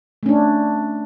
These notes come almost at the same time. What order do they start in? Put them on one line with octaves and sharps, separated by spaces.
A3 C#4 D4